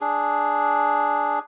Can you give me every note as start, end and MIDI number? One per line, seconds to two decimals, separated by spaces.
0.01 1.39 62
0.01 1.39 68